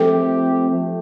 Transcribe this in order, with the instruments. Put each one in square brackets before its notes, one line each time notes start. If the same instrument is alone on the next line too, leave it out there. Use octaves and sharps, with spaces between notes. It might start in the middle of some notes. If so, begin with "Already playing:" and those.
Already playing: [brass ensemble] F3 A3 C4 G4 [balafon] A4
[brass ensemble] F3 A3